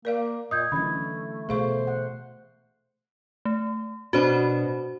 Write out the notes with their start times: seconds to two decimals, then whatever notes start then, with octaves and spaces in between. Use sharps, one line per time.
0.05 A#3 A#4 D5 F5
0.51 A#2 D#5 D#6 G6 G#6
0.72 D3 E3 F#3 A3 C#4 B5 G#6
1.49 B2 A3 G#4 C5 F5 C#6
1.87 F#5
3.45 A3
4.13 B2 B3 D4 F#4 C5 B5